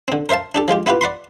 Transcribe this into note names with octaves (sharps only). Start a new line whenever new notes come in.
D3 C4
A#4 C5 E5 F5 A5
D4 G4 A4
F3 G#3 F4 G4
B3 E4 F4 G4 B4
D5 F#5 B5 C6